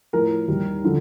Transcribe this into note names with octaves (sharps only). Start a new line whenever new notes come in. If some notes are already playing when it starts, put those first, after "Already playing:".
A2 F3 A#4
D#2 D#3 G3
D3 F3